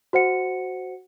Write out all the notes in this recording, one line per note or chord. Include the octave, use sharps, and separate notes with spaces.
F#4 C5 F#5 C#7